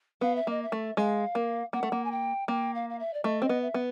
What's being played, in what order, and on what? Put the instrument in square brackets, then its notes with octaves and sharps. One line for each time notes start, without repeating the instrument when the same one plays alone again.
[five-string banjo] B3 [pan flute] F5
[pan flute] E5
[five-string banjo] A#3 [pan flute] D#5
[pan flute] E5
[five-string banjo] A3
[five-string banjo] G#3 [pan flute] F5
[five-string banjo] A#3
[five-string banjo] A#3 [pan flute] F#5
[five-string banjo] A3
A#3
[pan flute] G#5
G5
[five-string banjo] A#3 [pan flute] G5
[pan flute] F5
F5
E5
D5
[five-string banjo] A3 [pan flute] D#5
[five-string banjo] C4 [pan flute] D#5
[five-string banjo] B3
[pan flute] E5
[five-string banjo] B3